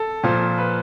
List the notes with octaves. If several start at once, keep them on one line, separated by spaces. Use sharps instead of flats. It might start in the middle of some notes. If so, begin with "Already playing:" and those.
Already playing: A4
A#2 F3
B4